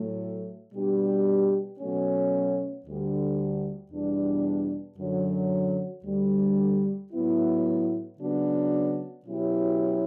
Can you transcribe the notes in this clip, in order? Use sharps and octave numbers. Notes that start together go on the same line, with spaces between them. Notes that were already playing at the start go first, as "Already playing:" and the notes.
Already playing: A2 F#3 A3
B2 G3 D4 G4
B2 F#3 A3 C#4
D2 D3 G3
E2 B2 G3 D4
F#2 D3 F#3
D2 D3 G3
A2 F#3 B3 E4
C#3 F#3 B3 D4 F#4
B2 F#3 C#4 E4 G4